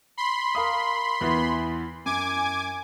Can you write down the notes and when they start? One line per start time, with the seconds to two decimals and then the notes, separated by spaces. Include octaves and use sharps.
0.18 B5 C6
0.55 A#4 F5 D#6
1.21 E2 E3 B3
2.06 F#2 G#5 D6 G#6